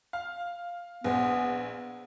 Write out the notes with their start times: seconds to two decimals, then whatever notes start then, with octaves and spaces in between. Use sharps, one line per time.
0.13 F5
1.04 A#1 B3 B4 C5 G#5